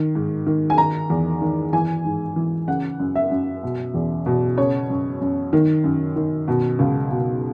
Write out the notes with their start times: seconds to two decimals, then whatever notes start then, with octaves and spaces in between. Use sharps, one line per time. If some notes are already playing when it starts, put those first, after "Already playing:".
Already playing: D#3
0.15 G#2
0.46 D#3
0.70 G#5
0.78 D#3 A#5
1.10 E2
1.41 D#3
1.73 E3 G#5
2.05 G#2
2.36 E3
2.68 C#3 F#5
3.00 F#2
3.15 E5
3.31 F#2
3.63 B2
3.94 E2
4.26 B2
4.58 C#3 C#5
4.90 F#2
5.21 F#2
5.53 D#3
5.84 F#2
6.16 D#3
6.48 B2
6.79 C#2
7.11 B2